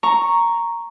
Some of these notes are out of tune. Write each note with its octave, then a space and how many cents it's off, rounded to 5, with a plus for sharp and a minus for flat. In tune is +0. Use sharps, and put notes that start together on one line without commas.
A#5 +0 C#6 +0